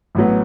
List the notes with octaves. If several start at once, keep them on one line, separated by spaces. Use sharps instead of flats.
A1 A2 F#3 B3